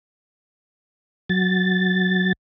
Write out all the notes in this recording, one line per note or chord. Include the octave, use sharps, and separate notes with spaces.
F#3 A6